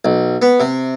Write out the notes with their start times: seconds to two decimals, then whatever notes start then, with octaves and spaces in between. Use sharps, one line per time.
0.05 B1
0.42 B3
0.60 C3